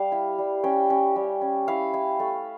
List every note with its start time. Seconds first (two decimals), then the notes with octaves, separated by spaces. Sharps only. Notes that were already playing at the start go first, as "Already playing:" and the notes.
Already playing: G3 F5
0.12 E4
0.38 G3
0.64 C#4 G5
0.90 C#4
1.16 G3
1.41 C#4
1.68 E4 F5
1.93 E4
2.19 A3